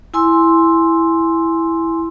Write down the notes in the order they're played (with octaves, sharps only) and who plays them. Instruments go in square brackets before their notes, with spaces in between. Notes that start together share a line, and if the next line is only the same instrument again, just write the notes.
[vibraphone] E4 G#5 C6 E6